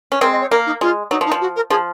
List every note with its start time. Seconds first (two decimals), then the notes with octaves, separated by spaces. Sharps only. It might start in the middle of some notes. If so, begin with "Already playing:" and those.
0.12 C#4
0.21 G#3 C4 A#4
0.32 D#5
0.41 C#5
0.51 A#3 A#4
0.66 D#4
0.81 G#3 F4
1.11 F#3 D#4
1.21 F3
1.26 D#4
1.32 F3
1.41 F#4
1.56 A#4
1.70 F3 G#4